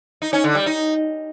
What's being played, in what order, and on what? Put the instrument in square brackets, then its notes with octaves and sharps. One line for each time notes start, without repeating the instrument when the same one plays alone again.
[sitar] D#4
C#4
D3
G3
D#4